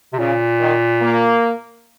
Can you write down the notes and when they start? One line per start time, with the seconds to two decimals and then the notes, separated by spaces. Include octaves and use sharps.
0.13 C3
0.18 A#2 C#3
0.60 D#3
1.02 A#3